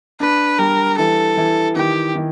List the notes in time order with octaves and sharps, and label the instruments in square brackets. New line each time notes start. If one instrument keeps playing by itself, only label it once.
[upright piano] D4 [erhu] B4
[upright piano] G3 [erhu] A#4
[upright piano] E3 [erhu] A4
[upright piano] E3
[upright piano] D#3 [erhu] G4
[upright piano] D#3